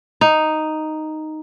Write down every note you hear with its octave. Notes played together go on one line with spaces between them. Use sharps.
D#4